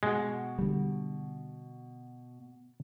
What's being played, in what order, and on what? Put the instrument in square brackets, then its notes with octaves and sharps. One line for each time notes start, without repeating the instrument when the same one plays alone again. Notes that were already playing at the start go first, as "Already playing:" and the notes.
[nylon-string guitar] B2 F#4 [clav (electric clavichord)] G#3
[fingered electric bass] D3 G3